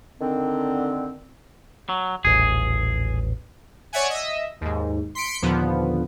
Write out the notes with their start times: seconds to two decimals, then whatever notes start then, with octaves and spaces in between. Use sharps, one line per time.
0.21 D3 D#3 C4
1.89 F#3
2.25 D#1 A1 G#4
3.93 C#5 D5 E5 F#5 G#5
4.10 D#5 E5
4.61 D#2 G#2
5.15 C6 B6 C#7 D7
5.42 D#2 A#2 D3 F3 B3